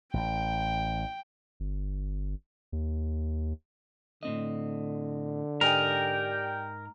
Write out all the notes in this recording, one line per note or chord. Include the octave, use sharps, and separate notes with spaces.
A1 G5
G1
D#2
A2 D3 C4 D#5
G#2 G4 A#4 D5 D#5 G5 G#5